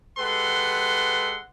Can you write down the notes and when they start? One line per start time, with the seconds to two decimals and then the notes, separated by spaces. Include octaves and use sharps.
0.18 G#3 G4 A4 B4 F#5 C6